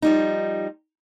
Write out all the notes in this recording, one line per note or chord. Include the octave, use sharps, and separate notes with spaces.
F3 G3 D#4